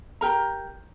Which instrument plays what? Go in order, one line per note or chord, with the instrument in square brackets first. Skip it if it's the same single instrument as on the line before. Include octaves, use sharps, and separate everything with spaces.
[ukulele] G4 A#4 A#5